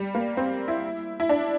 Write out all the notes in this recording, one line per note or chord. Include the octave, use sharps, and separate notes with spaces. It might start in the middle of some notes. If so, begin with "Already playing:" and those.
Already playing: G3
A#3
C4
E4
E4
D4